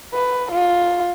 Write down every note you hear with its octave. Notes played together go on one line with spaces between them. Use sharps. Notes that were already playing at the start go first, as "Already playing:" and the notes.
B4
F4